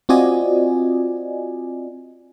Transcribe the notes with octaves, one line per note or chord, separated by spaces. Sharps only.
C4 F4 F#4 D5 D#5 G#5